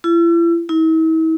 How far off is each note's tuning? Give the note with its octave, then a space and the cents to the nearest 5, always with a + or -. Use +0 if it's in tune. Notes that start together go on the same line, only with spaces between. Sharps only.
E4 +40
E4 -45